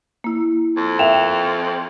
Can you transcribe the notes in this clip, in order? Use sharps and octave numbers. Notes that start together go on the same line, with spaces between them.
A#3 E4
F2
A#4 E5 F5 G5 E7 F7